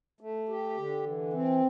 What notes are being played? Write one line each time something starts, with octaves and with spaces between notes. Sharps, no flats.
A3
G4
D3
E3
C4